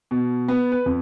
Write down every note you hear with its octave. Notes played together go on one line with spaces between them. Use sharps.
B2
B3
B4
F2